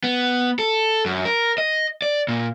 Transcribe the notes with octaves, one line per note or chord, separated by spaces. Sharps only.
B3
A4
F#2
A#4
D#5
D5
A#2